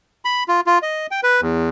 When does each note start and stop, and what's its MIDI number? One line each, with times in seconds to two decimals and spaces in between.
0.25 0.44 83
0.48 0.61 65
0.66 0.79 65
0.82 1.07 75
1.11 1.20 79
1.23 1.41 71
1.41 1.69 40